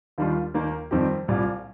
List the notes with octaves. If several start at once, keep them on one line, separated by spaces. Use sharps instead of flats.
D#2 D#3 G3 D4 F4
D#2 D#3 A#3
F2 D#3 G3 C4 G4
C2 A#2 G3